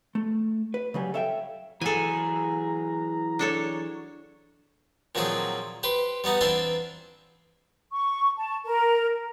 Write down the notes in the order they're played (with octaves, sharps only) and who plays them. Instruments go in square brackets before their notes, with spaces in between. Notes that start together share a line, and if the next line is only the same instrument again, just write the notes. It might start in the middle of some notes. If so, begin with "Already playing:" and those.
[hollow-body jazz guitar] A3
B4
C#3 F#3 G3 G#5
A4 C#5 E5 F5 G5
[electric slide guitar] E3 F#3 G#4 [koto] A4 G#5 [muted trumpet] A#5
[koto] D4 A4 C#5
[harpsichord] A#2 D#3 F3 F#3 C4 G#4
G4 B4 C5
G3 B3 D#4 F#5
E3 C4 D4 F4 E5 C6
[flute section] C#6
A5
A#4